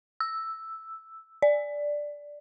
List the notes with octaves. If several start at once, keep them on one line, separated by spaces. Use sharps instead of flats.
E6
D5